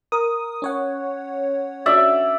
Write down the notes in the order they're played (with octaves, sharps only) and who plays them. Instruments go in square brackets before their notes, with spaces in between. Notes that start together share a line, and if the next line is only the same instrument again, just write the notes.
[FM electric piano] A#4 D#6
C#4 C#5 F#5
[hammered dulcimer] D5 E5